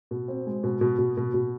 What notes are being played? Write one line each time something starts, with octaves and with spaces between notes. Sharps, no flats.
B2
C4
G#3
B2
B2
B2
B2
B2